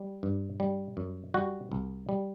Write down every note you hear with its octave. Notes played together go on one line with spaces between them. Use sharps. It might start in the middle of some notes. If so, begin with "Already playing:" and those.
Already playing: G3
G2
G3
F#2
G3 F#4
C2
G3